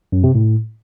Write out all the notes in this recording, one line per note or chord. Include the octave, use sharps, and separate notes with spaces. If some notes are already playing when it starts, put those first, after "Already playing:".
F#2
C3
A2